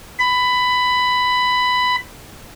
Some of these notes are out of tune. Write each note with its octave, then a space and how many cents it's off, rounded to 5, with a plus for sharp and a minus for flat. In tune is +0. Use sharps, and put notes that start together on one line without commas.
B5 +15